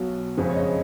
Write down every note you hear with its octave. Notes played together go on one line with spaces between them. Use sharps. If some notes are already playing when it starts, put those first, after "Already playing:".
Already playing: B1 B2 F#3
F#1 F2 C#3 G#3
C#5
D#5